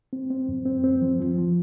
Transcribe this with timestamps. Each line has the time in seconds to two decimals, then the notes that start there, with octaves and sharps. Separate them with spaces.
0.13 C4
0.30 C4
0.49 F#2
0.65 C4
0.84 C4
1.02 F3
1.20 F3
1.38 F3